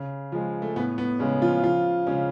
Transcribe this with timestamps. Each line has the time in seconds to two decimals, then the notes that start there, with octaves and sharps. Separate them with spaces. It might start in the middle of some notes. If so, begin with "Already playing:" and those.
Already playing: C#3
0.32 F3 G#3
0.62 A3
0.76 A2 B3
0.98 B3
1.19 C#3 G#3 C#4
1.42 F3 F4
1.63 C#3 F3 F4
2.07 C#3 G#3 C#4